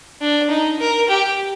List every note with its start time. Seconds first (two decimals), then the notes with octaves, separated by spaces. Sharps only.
0.21 D4
0.50 D#4
0.80 A#4
1.09 G4